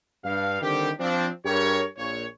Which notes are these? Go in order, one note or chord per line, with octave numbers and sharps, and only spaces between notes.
G2 F5
D3 D#3 G3 C4 G4
F3 C4 D4
G2 G4 G#4 A#4 C#5
A#1 A#2 C#5